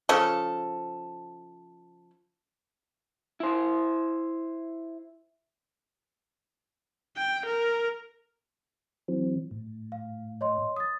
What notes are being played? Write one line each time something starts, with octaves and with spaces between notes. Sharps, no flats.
C#3 F3 A4
E4 C5
G5
A#4
E3 F#3 C4
A2
F5
C#5 D#5 C6
D#6 A6